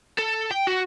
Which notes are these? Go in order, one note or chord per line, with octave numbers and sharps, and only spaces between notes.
A4
G5
F#4